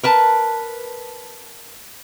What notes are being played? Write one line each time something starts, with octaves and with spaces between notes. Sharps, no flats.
A#4 B4 A5